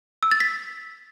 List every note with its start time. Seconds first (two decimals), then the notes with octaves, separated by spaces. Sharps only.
0.23 E6
0.31 A6
0.40 B6